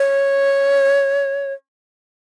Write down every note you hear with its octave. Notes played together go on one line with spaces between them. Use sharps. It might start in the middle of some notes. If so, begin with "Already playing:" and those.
Already playing: C#5